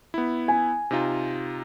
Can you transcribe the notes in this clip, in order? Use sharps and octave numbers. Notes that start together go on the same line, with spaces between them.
B3 E4
G#5
C3 D#4 F4